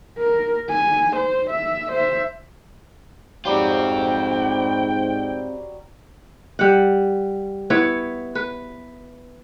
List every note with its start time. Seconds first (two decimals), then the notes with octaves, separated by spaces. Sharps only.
0.18 A#4
0.70 G#5
1.16 C5
1.50 E5
1.92 C5 E5
3.45 G#2 F#3 G3 C4 F4 F#4 G5
6.59 G3 F#5
7.70 B3 E4 B4 C#5
8.35 B4